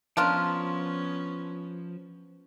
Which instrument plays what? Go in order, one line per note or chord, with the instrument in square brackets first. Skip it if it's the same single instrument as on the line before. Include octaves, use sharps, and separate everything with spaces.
[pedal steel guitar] F3 [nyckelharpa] B3 C#4 [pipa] D4 F4 A#4